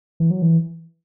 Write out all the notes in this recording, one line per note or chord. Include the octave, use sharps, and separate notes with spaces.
E3
F#3
E3